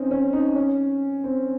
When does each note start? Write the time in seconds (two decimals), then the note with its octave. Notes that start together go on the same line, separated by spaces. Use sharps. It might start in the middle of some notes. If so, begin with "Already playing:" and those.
Already playing: C4 C#4 D#4
0.11 C#4
0.33 D#4
0.56 C#4
1.24 C4